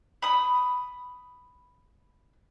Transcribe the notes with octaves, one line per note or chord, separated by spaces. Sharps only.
B5 D#6